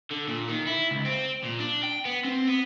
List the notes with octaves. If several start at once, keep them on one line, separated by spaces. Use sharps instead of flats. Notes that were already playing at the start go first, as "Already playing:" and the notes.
D3
A#2
D#3
E4
C#2
C4
A#2
D4
G5
B3
C4
B3